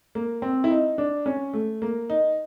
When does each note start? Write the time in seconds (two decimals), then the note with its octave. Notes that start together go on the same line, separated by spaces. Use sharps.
0.15 A#3
0.42 C4
0.64 E4
0.71 D#4
0.98 D4
1.26 C#4
1.53 A3
1.82 A#3
2.10 D#4